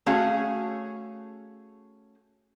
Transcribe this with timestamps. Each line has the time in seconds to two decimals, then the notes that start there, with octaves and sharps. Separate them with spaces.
0.06 A3 C#4 F#4 G#4 F5